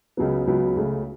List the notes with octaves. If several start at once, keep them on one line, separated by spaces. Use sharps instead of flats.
C#2 C#3 F#3 B3
C#2 C#3 F#3 B3
C#2 C#3 A3